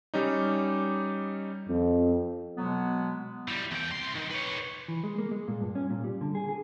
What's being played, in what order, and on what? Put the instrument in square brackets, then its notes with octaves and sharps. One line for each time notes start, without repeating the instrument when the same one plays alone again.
[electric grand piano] G3 C#4 D#4 [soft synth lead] D6
[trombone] F2 [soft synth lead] C4
[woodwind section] B2 F#3 G#3 B3
[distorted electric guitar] E3 G3
E2 G5
C2 C6
D#3
B4 C#5
[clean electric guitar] E3
G#3
A#3
G#3
A#2
G2
C#4
A#2
G3
D3
G#4
G#4